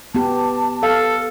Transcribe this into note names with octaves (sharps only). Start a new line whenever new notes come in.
B3 G4 A5
A4 F5